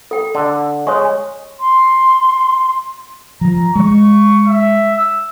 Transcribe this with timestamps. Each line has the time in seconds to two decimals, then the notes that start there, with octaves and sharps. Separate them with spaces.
0.11 A4 G5
0.35 D3
0.87 G#3 C#5 C#6
1.60 C6
3.41 F3 A#5
3.75 G#3 C#6
4.47 E5
4.95 E6